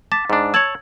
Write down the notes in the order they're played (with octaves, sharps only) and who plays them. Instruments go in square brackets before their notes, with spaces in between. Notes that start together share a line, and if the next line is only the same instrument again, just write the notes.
[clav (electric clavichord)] A5 [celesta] D6 A6 B6
[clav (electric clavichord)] G#2 D4
[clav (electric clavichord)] C#5 A5 [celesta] E6 G#6 F#7